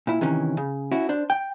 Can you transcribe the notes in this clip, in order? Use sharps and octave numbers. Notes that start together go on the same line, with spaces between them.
A#2 E4
C3 D#3 E3 C#4
C#3
C#4 E4 F#4
D4 C5
G5